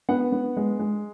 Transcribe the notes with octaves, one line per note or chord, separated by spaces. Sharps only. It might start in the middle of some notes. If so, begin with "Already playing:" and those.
B3 F#5
B3
G#3
G#3